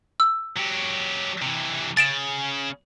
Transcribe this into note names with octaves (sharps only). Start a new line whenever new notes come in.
E6
F#3 G4
C3 E3
C#3 A6 D7 E7